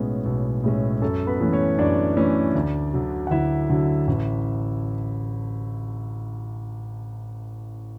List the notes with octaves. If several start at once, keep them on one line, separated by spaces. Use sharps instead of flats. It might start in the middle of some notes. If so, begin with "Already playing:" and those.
Already playing: B1 A2 G#3 B3 C#4
B1
A2 G#3 C#4
F#2 A4
B3 B4
E3 A3 C#4
C#4 C#5
F#2 D4 D5
E3 A3 C#4
D2
D3 F#3
F#5
D2 E4 E5
D3 F#3
A1